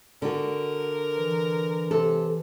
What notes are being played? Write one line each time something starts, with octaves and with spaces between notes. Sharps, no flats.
D3 F#4 A#4
E3
C3 A4